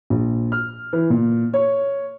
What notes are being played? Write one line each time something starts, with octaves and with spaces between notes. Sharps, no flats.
A#1
F6
E3
A#2
C#5